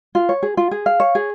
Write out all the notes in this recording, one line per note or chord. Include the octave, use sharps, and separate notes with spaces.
F4
C#5
G#4
F4
G#4
F5
C#5
G#4